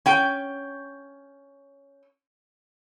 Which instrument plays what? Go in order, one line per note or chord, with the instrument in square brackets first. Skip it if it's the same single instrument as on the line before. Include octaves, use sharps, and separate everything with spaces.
[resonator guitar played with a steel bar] C#4 G5